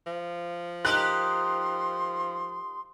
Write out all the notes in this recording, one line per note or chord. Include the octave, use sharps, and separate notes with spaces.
F3
D#4 G4 A#4 C6 F#6